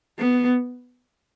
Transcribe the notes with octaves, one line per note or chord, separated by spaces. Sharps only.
B3